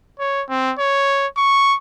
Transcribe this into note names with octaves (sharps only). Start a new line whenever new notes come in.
C#5
C4
C#5
C#6